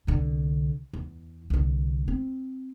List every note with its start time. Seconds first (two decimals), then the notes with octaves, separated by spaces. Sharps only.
0.07 C2 D3
0.93 E2
1.50 C2 D3
2.08 C4